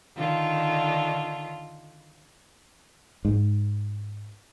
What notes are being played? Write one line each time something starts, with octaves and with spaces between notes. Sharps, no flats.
D3 D#3 F4
G#2